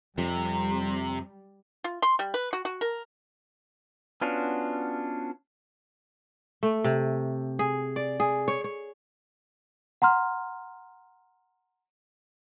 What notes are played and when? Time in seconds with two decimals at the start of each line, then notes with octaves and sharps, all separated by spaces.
0.18 F2 C3 G3
1.84 F4
2.02 C6
2.19 G3
2.34 B4
2.53 F#4
2.65 F#4
2.81 A#4
4.21 B3 C#4 D4 F4 F#4
6.63 A3
6.84 C3
7.59 G#4
7.96 D5
8.20 G#4
8.48 C#5
8.64 C#5
10.02 F#5 A#5 C6 F6